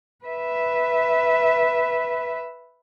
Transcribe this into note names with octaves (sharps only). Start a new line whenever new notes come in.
B4 E5